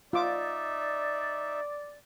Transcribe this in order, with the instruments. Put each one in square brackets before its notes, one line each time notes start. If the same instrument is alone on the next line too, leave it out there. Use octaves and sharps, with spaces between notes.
[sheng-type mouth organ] D#4 E5 [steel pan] F4 D6 [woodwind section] D5